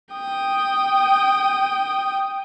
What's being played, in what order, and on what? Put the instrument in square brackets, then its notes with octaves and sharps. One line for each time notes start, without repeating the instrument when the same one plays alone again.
[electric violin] G5 D#6